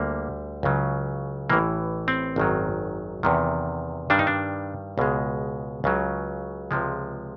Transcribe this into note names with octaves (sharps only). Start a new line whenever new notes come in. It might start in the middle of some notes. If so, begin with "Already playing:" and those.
Already playing: D2 D3 G3 A#3
C#2 C#3 F#3
A1 A2 E3 A#3
C4
G#1 F#2 D#3 F#3
E2 C3 D#3
G2 D#3 G3 D4
D#4
D4
C#2 B2 G#3
C#2 C#3 F#3
C#2 C3 F3 G#3